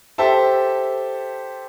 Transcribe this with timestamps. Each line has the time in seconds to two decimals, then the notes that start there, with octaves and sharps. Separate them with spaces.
0.18 G4 A4 C5 E5 A5